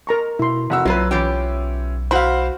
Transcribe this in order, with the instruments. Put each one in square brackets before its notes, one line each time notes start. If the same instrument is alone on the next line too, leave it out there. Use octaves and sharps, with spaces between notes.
[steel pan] A#4 A#5 C#6
[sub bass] B2 [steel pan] E4 C6
[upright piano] F1 F#4 E6
[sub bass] B1 [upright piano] F#3 B4 [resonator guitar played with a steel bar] A#3 F4 [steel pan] E5
[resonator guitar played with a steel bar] E3 F4 G4 [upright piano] C#4
[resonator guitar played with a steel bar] E4 F#4 [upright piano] C5 F5 [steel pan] B5